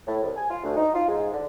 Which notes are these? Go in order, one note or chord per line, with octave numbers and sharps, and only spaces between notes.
A2
C2
G#5
F4
D2
D#4
F4
G#2
D3